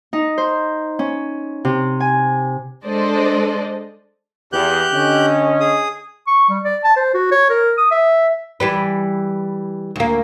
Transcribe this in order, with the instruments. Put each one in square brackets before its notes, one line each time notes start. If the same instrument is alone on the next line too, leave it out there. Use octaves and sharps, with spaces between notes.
[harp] D#4
C5
C#4
C3
G#5
[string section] G#3 D4 A4 C5 D5 D#5
[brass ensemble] E2 [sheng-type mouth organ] G4 F#6 G6
[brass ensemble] D3 C#4 D#5
[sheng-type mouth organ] G#4 D#6
[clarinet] C#6
G3
D5
A5
C5
F#4
C#5
A#4
D#6
E5
[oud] E3 G3 B4
D2 A#3